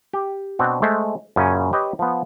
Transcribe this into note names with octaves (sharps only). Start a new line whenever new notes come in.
G4
B2 C4 D4 F#4
G#3 A3 C5 E5
F#2 A#2 C#3 C#4 G#5
G4 B4 C#5 D#5
F3 B3